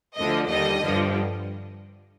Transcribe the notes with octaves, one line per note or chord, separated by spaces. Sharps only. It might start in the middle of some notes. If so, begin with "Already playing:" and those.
D2 D3 F3 D#5
D#2 D3 G3 D#5
G2 D3 F3